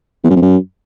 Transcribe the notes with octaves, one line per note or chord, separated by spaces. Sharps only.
E2
F#2
F2
F#2